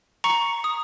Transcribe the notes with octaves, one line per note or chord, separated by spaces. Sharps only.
A#5 C#6 C#7
D#6